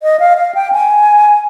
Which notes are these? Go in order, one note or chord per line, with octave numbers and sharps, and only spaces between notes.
D#5
F5
F5
G5
G#5